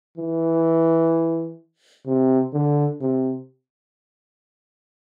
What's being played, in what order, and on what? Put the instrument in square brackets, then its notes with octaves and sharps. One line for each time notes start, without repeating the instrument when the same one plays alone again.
[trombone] E3
C3
D3
C3